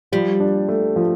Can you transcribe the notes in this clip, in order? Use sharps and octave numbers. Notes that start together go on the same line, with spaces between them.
F3 G3
D4
A3
F3